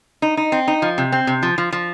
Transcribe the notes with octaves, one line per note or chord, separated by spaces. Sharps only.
D#4
D#4
C4
D#4
F3
C3
C4
C3
F3
F3
F3